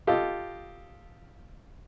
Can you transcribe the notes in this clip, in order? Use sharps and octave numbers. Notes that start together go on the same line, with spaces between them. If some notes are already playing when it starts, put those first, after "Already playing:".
F4 G4 A4 D#5